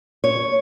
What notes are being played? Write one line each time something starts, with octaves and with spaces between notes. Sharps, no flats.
C#5